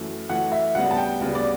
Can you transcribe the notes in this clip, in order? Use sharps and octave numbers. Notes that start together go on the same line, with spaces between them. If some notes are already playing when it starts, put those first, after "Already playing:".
Already playing: F#2 E3 A3
F#2 E3 A3 F#5
E5
D2 C#3 G3 B3 F#5
A5
G5
D2 C#3 G3 B3
D5